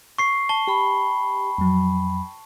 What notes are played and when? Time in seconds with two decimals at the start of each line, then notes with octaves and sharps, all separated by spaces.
0.18 C#6 C7
0.49 A5 G7
0.67 G4 G5 B5
1.58 F2 F#3